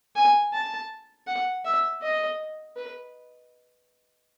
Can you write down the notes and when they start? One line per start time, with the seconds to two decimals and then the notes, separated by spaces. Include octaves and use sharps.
0.16 G#5
0.54 A5
1.27 F#5
1.65 E5
2.03 D#5
2.77 B4